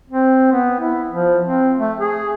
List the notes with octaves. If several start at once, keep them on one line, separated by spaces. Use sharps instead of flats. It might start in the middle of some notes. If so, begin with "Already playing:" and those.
C4
B3
E4
F3
C4
A3
G#4